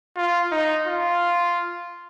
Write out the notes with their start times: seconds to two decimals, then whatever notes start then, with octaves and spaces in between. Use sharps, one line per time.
0.16 F4
0.51 D#4
0.88 F4